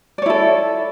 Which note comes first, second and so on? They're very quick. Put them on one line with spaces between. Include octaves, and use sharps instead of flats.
D5 C#5 E4 A4